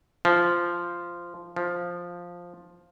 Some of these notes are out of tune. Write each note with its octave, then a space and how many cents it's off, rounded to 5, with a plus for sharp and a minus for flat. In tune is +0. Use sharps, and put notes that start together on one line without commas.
F3 -10
F3 +5